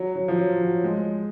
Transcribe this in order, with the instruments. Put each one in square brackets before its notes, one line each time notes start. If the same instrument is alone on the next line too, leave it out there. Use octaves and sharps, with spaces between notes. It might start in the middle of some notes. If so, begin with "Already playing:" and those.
Already playing: [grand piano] F#3
F#3
F3
F#3
F#3
G#3